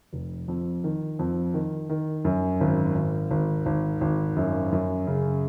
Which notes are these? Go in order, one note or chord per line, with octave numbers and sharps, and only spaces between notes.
F1
F2
D#3
F2
D#3
D#3
F#2
G#1
G#1
G#1
G#1
G#1
F#2
F#2
C#3